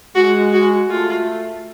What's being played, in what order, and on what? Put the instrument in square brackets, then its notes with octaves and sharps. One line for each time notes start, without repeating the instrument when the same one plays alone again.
[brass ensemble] G#3 [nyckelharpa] F#4
[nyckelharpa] F#4
[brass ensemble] A3 [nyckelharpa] F4